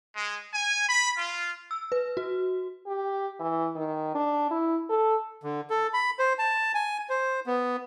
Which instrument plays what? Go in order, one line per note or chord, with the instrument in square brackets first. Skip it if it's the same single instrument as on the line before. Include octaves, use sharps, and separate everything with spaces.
[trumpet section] G#3
G#5
B5
F4
[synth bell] E6
B4
F#4
[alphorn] G4
E3
D#3
D4
E4
A4
[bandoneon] D3
A4
B5
C5
A5
G#5
C5
B3